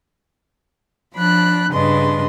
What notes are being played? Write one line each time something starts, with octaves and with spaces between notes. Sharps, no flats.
F3 D4 B5 F#6
G2 C#3 D4 B4 D#5 C6